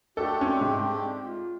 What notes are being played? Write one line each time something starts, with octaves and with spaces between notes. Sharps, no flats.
A3 D4 F#4 G4 A4
C4 C#4
G#2
F4